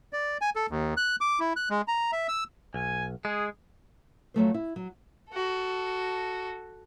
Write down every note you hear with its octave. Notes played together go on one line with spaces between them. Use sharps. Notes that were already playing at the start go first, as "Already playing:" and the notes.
D5
G#5
A4
D#2
F#6
D6
E4
F#6
G#3
A#5
E5
E6
B1 G#5
G#3 G#4
F2 F#3 A3 C5
E4
F#3
F#4 A4